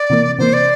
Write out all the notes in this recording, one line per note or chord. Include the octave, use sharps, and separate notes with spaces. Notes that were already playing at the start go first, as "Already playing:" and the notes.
Already playing: D5
C3 E3 A#3
C3 E3 A#3 C5
D5